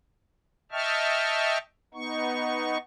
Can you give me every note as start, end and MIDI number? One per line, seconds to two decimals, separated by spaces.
0.72 1.58 75
0.72 1.58 76
0.72 1.58 79
0.72 1.58 81
0.72 1.58 85
0.72 1.58 89
1.94 2.78 59
1.94 2.78 63
1.94 2.78 85